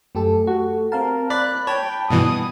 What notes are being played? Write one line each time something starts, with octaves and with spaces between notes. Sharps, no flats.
F#2 A3 G4 A4
F#4
C4 A#4 F5 A5
D5 B5 F#6
C#5 G5 A5
G2 B2 E3 D#6